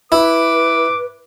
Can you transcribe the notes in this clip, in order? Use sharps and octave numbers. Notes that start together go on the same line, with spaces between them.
E4 B4 D6